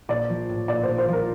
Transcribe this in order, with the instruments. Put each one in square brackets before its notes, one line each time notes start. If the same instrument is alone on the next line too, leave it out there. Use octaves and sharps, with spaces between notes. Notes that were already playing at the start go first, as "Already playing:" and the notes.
[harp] A#1 [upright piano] D5
[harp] F3
A2
[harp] A#1 [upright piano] D5
[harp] A#1 [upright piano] C5
[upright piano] C5
[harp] F3 [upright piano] A#4